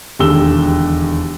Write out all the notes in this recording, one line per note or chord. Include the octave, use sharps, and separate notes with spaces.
E1 D#2 D3 G4 E6 G7